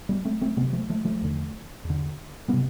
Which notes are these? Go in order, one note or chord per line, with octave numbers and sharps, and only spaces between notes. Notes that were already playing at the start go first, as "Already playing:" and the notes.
G3 B3
A3 C4
A3 C4
D2 C3 G3 B3
F3 A3
F3 A3
F3 A3
E2 D3
E2
D3
C3 G3 B3